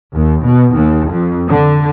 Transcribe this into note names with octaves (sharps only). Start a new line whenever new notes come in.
D#2
B2
D#2
F2
D3